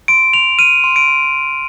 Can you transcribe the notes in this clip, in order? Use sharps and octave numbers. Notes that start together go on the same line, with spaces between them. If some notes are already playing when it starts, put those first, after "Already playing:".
C6 D7
C6 F7
F6 D#7
C6
D7
C6